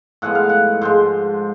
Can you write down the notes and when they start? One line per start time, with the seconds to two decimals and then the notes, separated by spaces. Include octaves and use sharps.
0.22 A2 F3 G#3 B3 F#5
0.35 F5
0.49 F#5
0.81 G#2 F3 G#3 C5